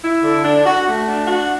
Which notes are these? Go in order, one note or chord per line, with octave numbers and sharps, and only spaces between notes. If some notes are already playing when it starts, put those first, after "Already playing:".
E4
D3
D4
F#4
A3
D4
F#4